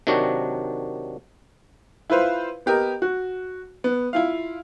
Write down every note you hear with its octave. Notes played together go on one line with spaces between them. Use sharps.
C3 D#3 F#3 D4 F#4
E4 F4 B4 C5 F5
B3 G4 A#4 D#5
F#4
B3
E4 F4 F5